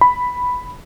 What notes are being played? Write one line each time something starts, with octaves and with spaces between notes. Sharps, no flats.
B5